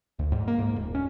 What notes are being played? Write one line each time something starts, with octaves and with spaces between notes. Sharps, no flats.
D2
G#2
A#3
G#2
D#1
C#4